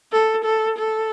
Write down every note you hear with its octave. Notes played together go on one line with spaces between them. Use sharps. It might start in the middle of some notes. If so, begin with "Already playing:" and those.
A4
A4
A4